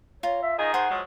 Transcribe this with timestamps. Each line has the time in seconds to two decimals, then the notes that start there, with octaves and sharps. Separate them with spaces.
0.23 F4 C#5 A#5
0.43 E5
0.59 D#3 D#4 G#4 D#5
0.74 C5 F#5 C6 D#6
0.90 F3 F#3 G#3